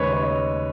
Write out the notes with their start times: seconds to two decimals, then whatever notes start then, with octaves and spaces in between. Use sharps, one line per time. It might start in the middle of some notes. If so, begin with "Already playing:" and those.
Already playing: D#2 C#3 G#3 B4 C#5
0.13 C#5
0.23 D#5